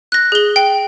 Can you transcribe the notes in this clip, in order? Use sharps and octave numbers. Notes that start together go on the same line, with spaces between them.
F#6 A#6
G#4 G7
G5